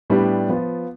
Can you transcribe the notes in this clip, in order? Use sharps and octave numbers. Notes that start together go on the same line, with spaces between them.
A2 G3 B3 D4 G4
F3 B3 F4